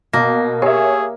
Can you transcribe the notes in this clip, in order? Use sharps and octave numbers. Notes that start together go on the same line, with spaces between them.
B2 A#3 A#6
G4 G#4 A#4 C#5 E5 G#5